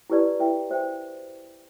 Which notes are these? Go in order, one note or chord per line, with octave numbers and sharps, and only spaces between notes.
E4 G4 B4 D5 A5
E4 B4 E5 G5
F#4 C5 E5 G5